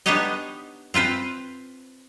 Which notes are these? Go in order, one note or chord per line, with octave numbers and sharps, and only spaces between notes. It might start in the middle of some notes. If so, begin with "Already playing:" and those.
B3 D4 D#4 G4 C#5 D#5
C4 F4 B4 C5